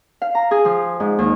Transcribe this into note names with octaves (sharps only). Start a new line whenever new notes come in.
F5
A#5
G#4
F3
G#2
D#2